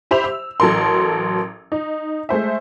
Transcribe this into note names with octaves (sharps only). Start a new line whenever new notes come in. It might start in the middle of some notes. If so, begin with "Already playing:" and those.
G4 C5 E5 B5 F7
E6
A1 F#3 A4 A#4 C6
D#4
G#3 A3 C5 E5